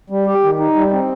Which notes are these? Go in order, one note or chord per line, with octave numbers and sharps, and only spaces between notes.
G3
G4
D#3
D#4
G3
C4